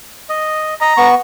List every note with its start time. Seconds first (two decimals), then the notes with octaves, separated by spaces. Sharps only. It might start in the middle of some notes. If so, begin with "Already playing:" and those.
0.29 D#5
0.81 D#5 A#5
0.97 B3 C#6